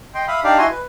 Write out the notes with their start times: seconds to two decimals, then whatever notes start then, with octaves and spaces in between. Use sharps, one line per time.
0.14 D#5 G5 C6
0.28 E5 F5 B5 D#6
0.44 D4 D#4 G4 D5 F5
0.58 E4 F#4 D#5 G#5 C6
0.71 B4